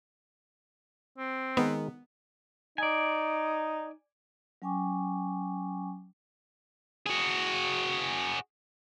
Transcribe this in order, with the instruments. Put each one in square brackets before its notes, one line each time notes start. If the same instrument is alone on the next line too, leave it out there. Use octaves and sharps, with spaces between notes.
[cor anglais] C4
[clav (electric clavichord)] D#3 G#3 A#4 [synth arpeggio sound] B3
[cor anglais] D#4 [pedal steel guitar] D5 G#5
[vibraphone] F#3 C#4 G5 G#5 C#6 D6
[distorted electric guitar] F#4 G#4